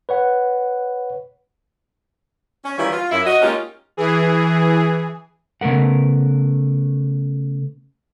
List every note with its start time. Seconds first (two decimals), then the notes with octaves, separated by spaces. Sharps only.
0.09 B4 C#5 F#5
2.64 C#4
2.77 D#3 E3 G3 C#4 E4 F4
2.92 F4
3.11 F#2 E4
3.25 F#4 D#5
3.42 G#3 A#3 C#4 D#4 F4 G4
3.97 E3 G#4
5.61 C#3 A3 B3 A#4 F#5